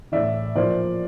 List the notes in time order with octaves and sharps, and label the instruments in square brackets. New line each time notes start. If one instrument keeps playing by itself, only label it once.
[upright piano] A2 E3 D5 E5
A#2 F3 C5 D5